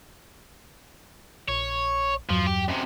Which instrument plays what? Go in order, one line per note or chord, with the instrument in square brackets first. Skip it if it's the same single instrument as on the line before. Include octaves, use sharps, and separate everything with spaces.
[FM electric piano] A#1 [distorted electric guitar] C#5
[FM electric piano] E2 G2 F#3 [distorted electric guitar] F3
[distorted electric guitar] G4
F#2 C3